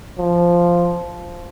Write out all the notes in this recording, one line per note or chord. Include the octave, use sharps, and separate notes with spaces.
F3